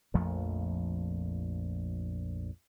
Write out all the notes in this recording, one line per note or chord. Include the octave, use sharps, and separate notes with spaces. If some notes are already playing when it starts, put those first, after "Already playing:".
A#1 F2 F3 A3